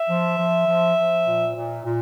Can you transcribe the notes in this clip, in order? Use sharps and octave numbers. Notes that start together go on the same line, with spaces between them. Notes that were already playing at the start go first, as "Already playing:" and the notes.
Already playing: E5
F3
F3
F3
F3
A#2
A#2
A#2